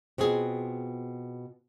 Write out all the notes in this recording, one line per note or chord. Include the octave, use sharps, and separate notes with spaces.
B2 C4 F4 G#4